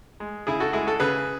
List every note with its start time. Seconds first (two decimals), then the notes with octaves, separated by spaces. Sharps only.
0.20 G#3
0.47 C#3 E4 G#4
0.60 F#4 A4
0.73 G#3 E4 G#4
0.86 F#4 A4
1.00 C#3 G#4 B4